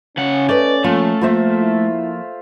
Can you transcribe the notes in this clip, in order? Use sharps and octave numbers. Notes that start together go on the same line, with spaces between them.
C#3 C#4 F#5
A3 B4 D5 D#5
F3 A3 A#3 F4
F3 A#3 F4 C5 E5
E4